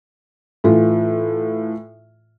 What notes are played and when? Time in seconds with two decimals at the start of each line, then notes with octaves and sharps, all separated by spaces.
0.64 A2 E3 F4